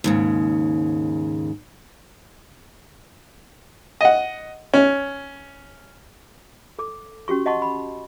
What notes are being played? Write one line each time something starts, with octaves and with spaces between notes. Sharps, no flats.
D#2 G#2 C#3
D#5 F#5
C#4
A4 D6
C#4 F#4 G4 C#6
D#5 F#5 A5 C6 C#6
B5